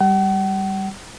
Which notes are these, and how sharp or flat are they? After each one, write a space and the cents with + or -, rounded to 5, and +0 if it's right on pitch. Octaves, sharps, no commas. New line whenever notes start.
G3 +0 F#5 +45